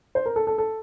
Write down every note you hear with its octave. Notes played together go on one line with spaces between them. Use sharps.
C5
A#4
A4
A4
A4